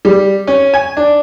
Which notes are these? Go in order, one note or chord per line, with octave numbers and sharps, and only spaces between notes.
G3
C#4
G#5
D4